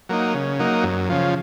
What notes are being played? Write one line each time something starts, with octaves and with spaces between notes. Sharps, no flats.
F#3 A#3 D#4
C#3
F#3 A#3 D#4
F#2
C#3 F3